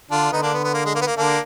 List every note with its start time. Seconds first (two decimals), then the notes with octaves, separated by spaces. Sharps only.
0.10 D3 D4 F4
0.32 D3 B3 D#4
0.43 A#3 D4
0.53 B3
0.64 B3
0.74 A#3
0.85 G#3
0.95 A#3
1.01 B3
1.07 A#3
1.17 D3 A#3 D4